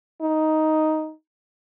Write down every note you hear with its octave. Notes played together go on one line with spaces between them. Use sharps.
D#4